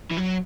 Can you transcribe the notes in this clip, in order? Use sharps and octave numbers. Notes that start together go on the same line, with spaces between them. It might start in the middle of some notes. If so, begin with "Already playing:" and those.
E3
F#3